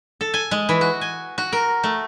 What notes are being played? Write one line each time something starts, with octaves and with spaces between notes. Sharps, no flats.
A4
G#5
G#3
E3
F#4
G#5
F#4
A#4
A3